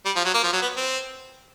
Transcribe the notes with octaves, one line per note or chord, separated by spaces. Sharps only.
G3
F3
F#3
A#3
F3
F#3
B3
C4